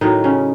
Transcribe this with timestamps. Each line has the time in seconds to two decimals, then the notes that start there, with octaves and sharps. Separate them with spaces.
0.01 A2 D#3 F#3 D#4
0.24 C#3 C#4